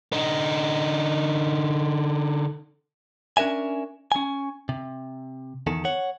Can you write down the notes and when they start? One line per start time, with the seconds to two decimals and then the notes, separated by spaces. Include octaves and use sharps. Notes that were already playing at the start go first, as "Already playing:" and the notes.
0.12 D3 D#4
3.37 C#4 D4 A#4 E5 G#5
4.12 C#4 G#5
4.69 C3
5.67 E2 D#3 A4
5.85 C#5 F#5